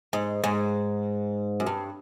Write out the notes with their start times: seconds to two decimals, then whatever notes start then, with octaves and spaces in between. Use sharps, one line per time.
0.13 G#2
0.44 G#2
1.60 F#2
1.67 G2